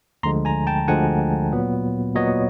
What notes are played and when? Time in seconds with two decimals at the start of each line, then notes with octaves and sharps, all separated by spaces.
0.23 D2 D3 F3 G#3 A#5 C6
0.45 G#5 A#5
0.67 G5 A5
0.87 D2 D3 F3 G#3 F#5 G#5
1.52 A#2 F#3 B3
2.15 A#2 F#3 B3 C#5 D#5